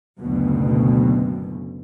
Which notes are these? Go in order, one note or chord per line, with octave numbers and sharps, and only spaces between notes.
F#1 D2 B2